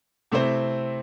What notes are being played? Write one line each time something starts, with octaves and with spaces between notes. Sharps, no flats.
C3 A3 C4 E4 C5